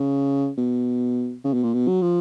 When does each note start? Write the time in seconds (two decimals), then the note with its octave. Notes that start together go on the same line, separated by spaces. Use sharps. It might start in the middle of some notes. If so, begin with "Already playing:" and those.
Already playing: C#3
0.57 B2
1.44 C#3
1.54 B2
1.63 A#2
1.73 B2
1.88 F#3
2.02 F3